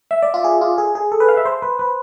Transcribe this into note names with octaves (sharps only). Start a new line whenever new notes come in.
E5
D5
F4
G#4
F4
G#4
G#4
A4
B4
F5
E5
C5
B4
B4